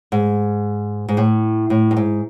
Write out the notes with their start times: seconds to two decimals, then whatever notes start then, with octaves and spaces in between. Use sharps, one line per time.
0.12 G#2
1.09 G#2
1.17 A2
1.70 A2
1.91 G2
1.96 G#2